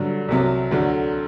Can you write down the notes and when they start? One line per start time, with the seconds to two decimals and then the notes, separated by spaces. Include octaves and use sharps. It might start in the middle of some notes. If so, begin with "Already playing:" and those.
Already playing: G2 D3 F#3
0.29 C2 C3 F#3
0.71 D2 D3 F#3